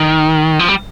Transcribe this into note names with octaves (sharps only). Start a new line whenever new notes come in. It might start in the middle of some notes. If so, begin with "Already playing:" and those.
Already playing: D#3
F3
G3